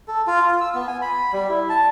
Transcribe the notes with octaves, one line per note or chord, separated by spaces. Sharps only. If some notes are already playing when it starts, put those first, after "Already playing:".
A4
F4
F4
E6
B3
G#5
B5
G3
E4
A5